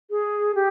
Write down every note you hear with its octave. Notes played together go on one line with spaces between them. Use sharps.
G#4
G4